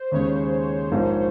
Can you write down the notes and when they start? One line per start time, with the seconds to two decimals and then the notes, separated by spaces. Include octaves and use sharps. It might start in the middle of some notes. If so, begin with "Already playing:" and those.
Already playing: C5
0.11 D#2 C#3 G#3 C#5
0.92 A#1 G#2 F3 A#3 F4